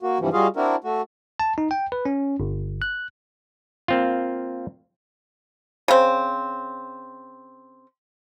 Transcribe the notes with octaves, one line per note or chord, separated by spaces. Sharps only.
A#3 F#4
G2 C3 E3 F3 G3
G3 F4 F#4 G#4 D#5 F5
C4 D4 E4 F#4 A#4
A3 F#4
A5
D#4
G5
B4
C#4
G1
F#6
A#3 C4 F4
C#3 C4